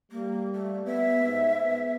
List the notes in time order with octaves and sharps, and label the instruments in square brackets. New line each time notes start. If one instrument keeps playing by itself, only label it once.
[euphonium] G3 [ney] A#3
[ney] A3
[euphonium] B3 [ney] E5
[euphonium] G#2
B3